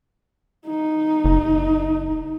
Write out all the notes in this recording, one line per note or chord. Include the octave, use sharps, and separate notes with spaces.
D#4
F#1